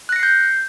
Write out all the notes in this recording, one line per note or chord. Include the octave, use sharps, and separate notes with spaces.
F#6 G6 A#6 C7 C#7